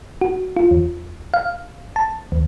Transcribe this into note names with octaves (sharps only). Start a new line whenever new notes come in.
F#4
F4
E2
F5
A5
D#2